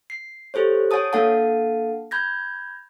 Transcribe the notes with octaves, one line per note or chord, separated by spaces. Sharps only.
C7
G4 A4 C5 C#5
C#5 F#5 G#5 A5 D#6
A#3 D4 A4 F5 F#5 A5
B5 G6 G#6 A#6